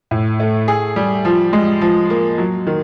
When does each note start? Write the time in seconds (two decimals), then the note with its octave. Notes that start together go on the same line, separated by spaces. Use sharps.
0.11 A2
0.40 A3
0.68 G#4
0.96 G3
1.25 F3
1.53 G#3
1.81 F3
2.10 A#3
2.38 F#3
2.67 D#3